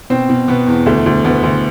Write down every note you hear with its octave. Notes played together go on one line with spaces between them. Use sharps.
B2 C4
B2
B2 B3
E2
D2 A3
D2
D2 B3
D2